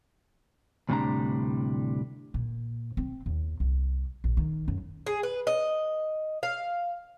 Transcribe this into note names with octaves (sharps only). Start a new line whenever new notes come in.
D2 A2 C3 G3 D4 A#5
A#2
C4
D#2
C2
A#1
D#3
F#2
G#4
B4
D#5
F5